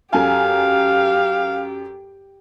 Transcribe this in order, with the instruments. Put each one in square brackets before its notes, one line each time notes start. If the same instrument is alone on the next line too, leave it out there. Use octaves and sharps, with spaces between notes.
[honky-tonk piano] F#2 A4 G#5 [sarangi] G4 [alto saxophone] F5